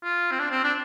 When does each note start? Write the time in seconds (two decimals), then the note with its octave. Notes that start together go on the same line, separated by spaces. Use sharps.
0.03 F4
0.31 C4
0.39 D4
0.51 C4
0.64 D4